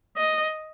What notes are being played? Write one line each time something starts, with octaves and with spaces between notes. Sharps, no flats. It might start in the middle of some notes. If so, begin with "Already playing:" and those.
D#5